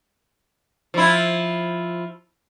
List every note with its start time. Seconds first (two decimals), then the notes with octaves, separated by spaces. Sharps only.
0.94 F3 E4